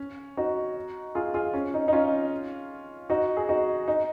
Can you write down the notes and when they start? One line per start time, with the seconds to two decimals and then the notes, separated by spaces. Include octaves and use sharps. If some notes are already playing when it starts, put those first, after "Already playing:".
Already playing: C#4
0.37 D#4 F#4
1.15 F4 G#4
1.34 F4 G#4
1.54 C#4
1.74 D#4
1.88 D#4
1.93 C#4 F4
3.10 D#4 F#4
3.37 G#4
3.49 D#4 F#4
3.88 D#4